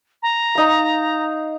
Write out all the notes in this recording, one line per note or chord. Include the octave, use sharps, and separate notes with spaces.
A#5
D#4 F5